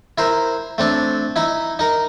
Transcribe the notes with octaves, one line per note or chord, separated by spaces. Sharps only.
E4 A#4 C5
A3 C4 D4
D#4 E4
D#4 A#4